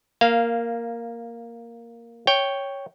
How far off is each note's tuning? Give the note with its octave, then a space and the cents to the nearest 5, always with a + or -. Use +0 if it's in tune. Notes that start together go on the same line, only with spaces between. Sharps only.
A#3 +0 F5 -10
C#5 +0 G5 +0